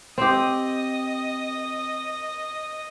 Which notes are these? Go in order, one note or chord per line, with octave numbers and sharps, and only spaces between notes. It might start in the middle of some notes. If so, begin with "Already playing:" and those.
C4 G4 D#5